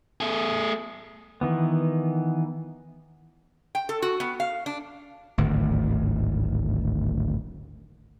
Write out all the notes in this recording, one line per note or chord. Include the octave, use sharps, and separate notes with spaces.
A3 G#4
D#3 E3 B3
G5
A4
F#4
B3
F5
D4
D1 G#1 D2